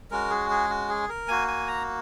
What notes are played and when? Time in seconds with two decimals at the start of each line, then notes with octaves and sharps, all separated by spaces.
0.11 G#3 C#4 F#4 A#4
0.30 G#4
0.50 G#4
0.70 F#4
0.89 G#4
1.09 A#4
1.28 A#3 F#4 G#5
1.48 G#5
1.67 A#5